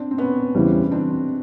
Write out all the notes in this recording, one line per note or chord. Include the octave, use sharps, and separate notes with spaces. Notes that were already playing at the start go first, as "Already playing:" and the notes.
Already playing: C4 D4
C4
B3 C#4
E2 C#3 E3 G3 C4
C4 D4